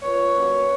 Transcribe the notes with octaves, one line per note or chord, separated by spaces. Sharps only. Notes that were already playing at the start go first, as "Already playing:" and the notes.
A#2 B4 C#5
F#3 A#3 C#4